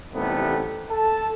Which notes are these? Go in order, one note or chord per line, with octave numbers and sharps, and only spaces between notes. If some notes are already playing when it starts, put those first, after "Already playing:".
A1 C3 D#3 G3 A3 B3
A4 A5